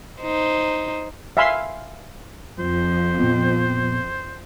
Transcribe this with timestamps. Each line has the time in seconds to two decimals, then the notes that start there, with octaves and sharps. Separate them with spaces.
0.22 D#4 C5
1.37 E5 F5 G#5 B5 C6
2.59 F2 F3 C5
3.19 A#2 B3